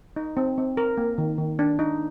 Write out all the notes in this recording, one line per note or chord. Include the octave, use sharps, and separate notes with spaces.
D#4
C4
C4
A#4
A#3
D#3
D#3
D4
D#4